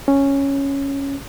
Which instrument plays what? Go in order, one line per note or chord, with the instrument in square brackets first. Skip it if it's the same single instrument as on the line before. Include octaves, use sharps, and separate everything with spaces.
[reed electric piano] C#4